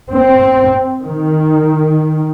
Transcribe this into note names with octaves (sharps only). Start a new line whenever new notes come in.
C4
D#3